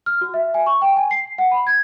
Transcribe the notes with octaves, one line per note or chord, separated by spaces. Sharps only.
F6
F#4
E5
G#5
C#6
G5
G#5
C7
F#5
B5
G#6